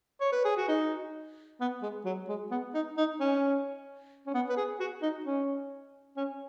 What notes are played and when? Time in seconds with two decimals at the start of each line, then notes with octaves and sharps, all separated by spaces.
0.21 C#5
0.32 B4
0.45 G#4
0.57 F#4
0.68 D#4
1.60 B3
1.82 G#3
2.05 F#3
2.28 G#3
2.51 B3
2.74 D#4
2.97 D#4
3.20 C#4
4.26 C#4
4.34 B3
4.49 B4
4.57 G#4
4.80 F#4
5.02 D#4
5.26 C#4
6.17 C#4